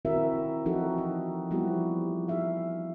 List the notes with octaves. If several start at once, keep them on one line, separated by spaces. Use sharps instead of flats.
D#3 C4 E4 F#4 A#4 E5
E3 F3 C4 D#4 F#4 A4
F#4
F3 G3 B3 E4 F#4 G4
D#4 G#4 E5 F5